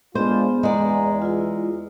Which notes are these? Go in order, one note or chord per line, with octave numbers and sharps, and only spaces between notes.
G#3 B3 D4 F4 C5
E2 G#3 D5 F#5 G#5 A#5
E4 F4